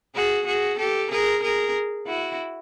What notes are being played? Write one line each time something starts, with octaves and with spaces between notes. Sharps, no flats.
F#4 G#4
F#4 G#4
G4 A4
G#4 A#4
G#4 A#4
E4 F#4